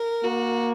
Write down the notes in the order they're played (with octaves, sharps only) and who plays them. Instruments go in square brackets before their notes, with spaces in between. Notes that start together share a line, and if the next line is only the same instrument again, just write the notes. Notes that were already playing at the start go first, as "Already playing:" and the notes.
Already playing: [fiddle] A#4
[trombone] A#3 [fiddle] F#4